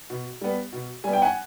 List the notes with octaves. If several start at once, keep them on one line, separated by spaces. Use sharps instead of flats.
B2
G3 B3
B2
G3 B3 G#5
G5
F#5 G#5